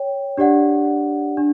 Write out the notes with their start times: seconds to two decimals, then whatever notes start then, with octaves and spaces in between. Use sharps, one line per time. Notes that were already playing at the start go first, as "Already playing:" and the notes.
Already playing: C#5 G5
0.37 D4 G4 D5 F#5
1.37 D4